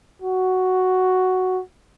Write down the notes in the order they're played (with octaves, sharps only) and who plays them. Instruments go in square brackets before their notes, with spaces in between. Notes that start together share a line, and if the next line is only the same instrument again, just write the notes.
[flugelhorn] F#4